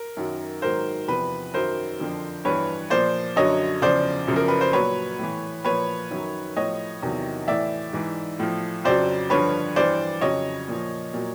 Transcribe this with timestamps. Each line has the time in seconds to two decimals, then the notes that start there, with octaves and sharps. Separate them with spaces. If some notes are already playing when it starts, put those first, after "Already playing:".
Already playing: A#4
0.17 F#2 D#3 F#3
0.62 G#2 D#3 F#3 A#4 C5
1.08 E2 C3 F3 B4
1.54 F#2 D#3 F#3 A#4 C5
2.00 F2 D3 F3
2.45 G2 E3 B4 C#5
2.90 A#2 F3 C5 D5
3.36 F#2 D3 F#3 C#5 D#5
3.82 E2 C#3 F3 C5 D5
4.28 F#2 C#3 F3
4.36 A#4
4.48 B4
4.61 C5
4.73 A#2 F#3 B4 C#5
5.19 A2 E3
5.65 A#2 F3 B4 C#5
6.11 F#2 D#3 F#3
6.56 A2 F3 C#5 D#5
7.02 E2 C3 D#3 F#3
7.48 A2 E3 D5 E5
7.93 G#2 E3
8.39 A2 F3
8.85 F2 C#3 F#3 C5 D5
9.30 G2 D3 F3 B4 C#5
9.76 G2 E3 C5 D5
10.21 F2 C#3 F#3 C#5 D#5
10.68 A#2 F3
11.14 A#2 F#3